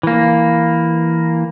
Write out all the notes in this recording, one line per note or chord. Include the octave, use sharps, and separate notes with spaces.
E3 A#3